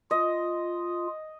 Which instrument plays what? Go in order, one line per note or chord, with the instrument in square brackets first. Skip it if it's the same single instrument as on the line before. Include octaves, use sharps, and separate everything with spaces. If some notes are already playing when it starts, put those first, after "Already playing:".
[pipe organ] F4 [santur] D#5